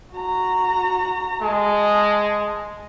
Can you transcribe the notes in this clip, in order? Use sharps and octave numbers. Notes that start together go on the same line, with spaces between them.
F#4 A#5
G#3 A5